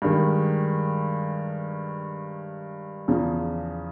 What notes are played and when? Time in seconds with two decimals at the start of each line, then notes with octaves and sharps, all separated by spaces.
0.02 G2 D#3 G#3
3.08 E2 C#3 F3